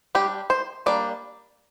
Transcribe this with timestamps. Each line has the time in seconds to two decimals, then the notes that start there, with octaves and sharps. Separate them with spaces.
0.15 G3 D4 G4
0.50 C5
0.86 G3 A#3 D4 D5